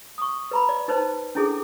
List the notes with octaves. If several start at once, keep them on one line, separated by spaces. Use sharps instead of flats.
C#6 D#6
B4 A#5 B5
D5
D#4 B4 C5 A5
C#4 D4 E4 G#4 A4 D6